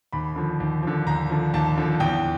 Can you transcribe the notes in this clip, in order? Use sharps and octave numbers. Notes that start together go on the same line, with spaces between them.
D#2 B5
D3 F3
D#2
D3 F3
D#2 A#5
D3 F3
D#2 A5
D3 F3
E2 G5